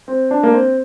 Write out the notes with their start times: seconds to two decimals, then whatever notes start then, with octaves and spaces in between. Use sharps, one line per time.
0.08 C4
0.31 D4
0.43 A#3
0.53 C4